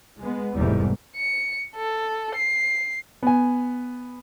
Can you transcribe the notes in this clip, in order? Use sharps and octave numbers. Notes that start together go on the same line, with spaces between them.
G#3 B3
F1 E2 G#2 G3 A3
C#7
A4
C7
B3 G#5